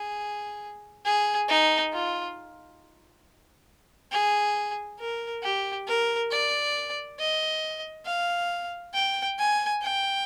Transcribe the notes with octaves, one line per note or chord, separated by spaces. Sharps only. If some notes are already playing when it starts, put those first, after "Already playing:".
Already playing: G#4
G#4
D#4
F4
G#4
A#4
G4
A#4
D5
D#5
F5
G5
G#5
G5